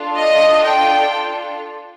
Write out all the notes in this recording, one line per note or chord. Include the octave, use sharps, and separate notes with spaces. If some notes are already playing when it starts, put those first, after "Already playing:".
Already playing: D4 F4 A4
D#5
G5